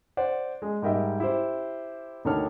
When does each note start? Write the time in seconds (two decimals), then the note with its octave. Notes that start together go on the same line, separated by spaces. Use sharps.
0.17 C5 D5 F#5
0.62 G#3
0.82 G#2 G3 A#4 D#5 E5 G5
1.20 E4 G4 C5
2.25 D2 D#3 D4 C#5 F6